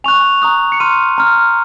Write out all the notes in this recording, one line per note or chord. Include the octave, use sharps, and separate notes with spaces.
G#5 C#6 F#6 F7
A#5 D#6 F#6
C#7
C6 F6 D#7
A#5 F6